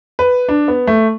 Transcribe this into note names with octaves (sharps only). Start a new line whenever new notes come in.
B4
D4
B3
A3